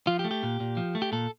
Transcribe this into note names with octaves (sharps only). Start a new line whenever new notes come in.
F3 F4
G4
A3
G4
A#2
A#2
F3
A3
G4
A#2 A4